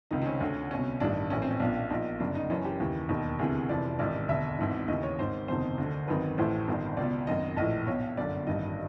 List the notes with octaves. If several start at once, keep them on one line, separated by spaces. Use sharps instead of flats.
C#2 C3 D#3 D#4
C4
C#4
D2 D3
C2 B2 C#4
A1 G2 D#3 D4
A#1 A2 E3 C#4
C4
C#4
B1 A#2 D4
A#1 A#2 D#4
G1 F#2 C#3 D4
D#4
F#1 F#2 C#3 E3 C#4
G4
D#2 C#3 E3
E1 D#2 D#3
D2 C3 E3 G#4
F1 F2 C3 E3 D5
A1 G#2 D#3 D5
E1 D2 D3 E5
G#1 G#2 E3
D#2 C#3 E3 D#5
C#5
G#1 G#2 D#3 C5
F#1 E2 C3 D#3 C5
D2 D3
G#1 F#2 D#3 B4
A1 A2 E3 C5
G1 G2 D#3
C#2 B2 D5
G#1 F#2 D#3 D#5
A#1 A2 E3 D#5
B1 B2 C#5
G1 F#2 D3 D5
A1 G2 D#3 D#5